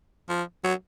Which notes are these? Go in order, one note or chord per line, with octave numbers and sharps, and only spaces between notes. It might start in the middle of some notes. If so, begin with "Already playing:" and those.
F3
F#3